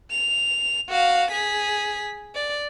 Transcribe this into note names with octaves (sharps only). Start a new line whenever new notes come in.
F7
F#4 F5
G#4 B6
D5